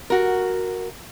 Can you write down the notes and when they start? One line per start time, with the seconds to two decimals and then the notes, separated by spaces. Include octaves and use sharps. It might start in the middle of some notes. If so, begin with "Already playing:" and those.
0.10 F#4 A#4